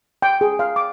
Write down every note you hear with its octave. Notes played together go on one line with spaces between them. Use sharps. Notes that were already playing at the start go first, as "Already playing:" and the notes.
G5
G#4
F5
D6